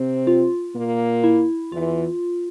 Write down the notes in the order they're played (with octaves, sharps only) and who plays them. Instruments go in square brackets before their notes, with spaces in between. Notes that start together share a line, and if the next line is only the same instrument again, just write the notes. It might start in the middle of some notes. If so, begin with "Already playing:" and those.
Already playing: [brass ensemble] C3 C4
[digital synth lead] F4
[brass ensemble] A#2 A#3
[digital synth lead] E4
[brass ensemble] E2 E3 [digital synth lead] F4